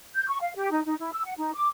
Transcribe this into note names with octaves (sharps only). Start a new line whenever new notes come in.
G6
C#6
F5
G4
D#4
D#4
E4
E6
F#5
D#4
D6